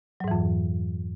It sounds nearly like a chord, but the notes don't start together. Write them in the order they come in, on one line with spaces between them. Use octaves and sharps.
F#3 G#2 E3 F2